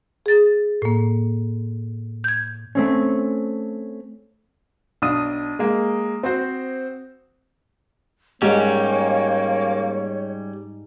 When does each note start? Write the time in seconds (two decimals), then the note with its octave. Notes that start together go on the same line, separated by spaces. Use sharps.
0.26 G#4 A6
0.82 A2 A#3
2.24 G6 G#6
2.75 A3 C4 C#4
5.02 B1 D4 D#6 D#7
5.59 G#3 A#3
6.23 C4 F#4 C5
8.42 G#2 G3 A#3 C#4 G4 C#5